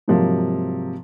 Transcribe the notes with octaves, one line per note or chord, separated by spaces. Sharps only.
G#2 C3 F3 F#3 A#3